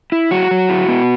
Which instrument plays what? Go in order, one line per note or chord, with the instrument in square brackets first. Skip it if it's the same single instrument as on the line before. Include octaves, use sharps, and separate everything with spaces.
[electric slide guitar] E4
F#3 F#4
F#3
E4
B3